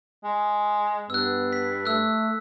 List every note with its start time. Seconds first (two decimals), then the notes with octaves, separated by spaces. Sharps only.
0.24 G#3
1.10 G2 B3 E6 F#6
1.53 B6
1.86 A3 E6 F#6